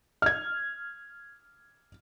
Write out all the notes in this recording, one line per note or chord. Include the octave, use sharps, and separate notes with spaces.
F6 G#6